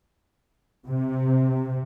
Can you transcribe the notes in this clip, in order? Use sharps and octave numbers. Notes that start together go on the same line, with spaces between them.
C3